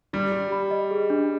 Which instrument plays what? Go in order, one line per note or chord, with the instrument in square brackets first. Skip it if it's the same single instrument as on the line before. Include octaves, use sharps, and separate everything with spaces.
[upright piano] G3 [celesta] G4
[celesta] G4
B5
D#5
G#4
D4